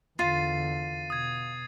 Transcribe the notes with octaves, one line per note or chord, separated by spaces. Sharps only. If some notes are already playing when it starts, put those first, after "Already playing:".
E2 D3 F4 A6 C7 D#7
B2 D#6 G#6